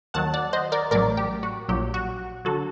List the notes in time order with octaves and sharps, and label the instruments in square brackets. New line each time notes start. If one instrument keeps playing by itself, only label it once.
[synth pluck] D#2 D#3 F#3 F#5 A5
D5 F#5
C5 D#5
A#4 D5
A1 A2 F#3 A#4 D5
G4
F#4
A#1 A#2 F#3 G4
F#4
D3 F#3 F#4 A4